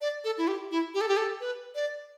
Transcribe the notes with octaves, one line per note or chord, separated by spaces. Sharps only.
D5
A4
E4
G4
E4
G4
A4
G4
A4
B4
D5